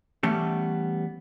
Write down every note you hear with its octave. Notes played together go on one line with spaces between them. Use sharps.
E3 G3 A3 B3 C#4